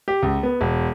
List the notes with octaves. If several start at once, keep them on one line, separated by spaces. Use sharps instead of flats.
G4
C#2
B3
E1